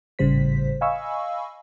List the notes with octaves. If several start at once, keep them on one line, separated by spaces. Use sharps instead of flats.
G#1 A2 C#3 G3 C5 B6
D#5 F5 G#5 B5 C#6 E6